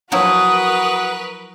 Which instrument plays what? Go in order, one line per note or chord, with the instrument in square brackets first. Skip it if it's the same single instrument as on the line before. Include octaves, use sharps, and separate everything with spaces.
[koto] F3 F#3 E4 [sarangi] F#4 [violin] A#4 B4 [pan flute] D#6